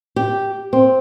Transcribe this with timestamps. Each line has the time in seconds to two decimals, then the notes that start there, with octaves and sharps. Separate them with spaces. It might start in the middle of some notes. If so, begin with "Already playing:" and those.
0.16 G4
0.73 C4